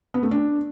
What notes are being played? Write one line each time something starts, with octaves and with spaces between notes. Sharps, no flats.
B3
A3
D4